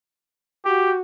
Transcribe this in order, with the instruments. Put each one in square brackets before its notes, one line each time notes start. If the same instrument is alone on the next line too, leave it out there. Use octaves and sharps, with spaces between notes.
[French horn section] F#4 [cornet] G4